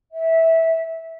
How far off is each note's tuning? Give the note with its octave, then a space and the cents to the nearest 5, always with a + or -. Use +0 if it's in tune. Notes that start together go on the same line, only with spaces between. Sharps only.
E5 -15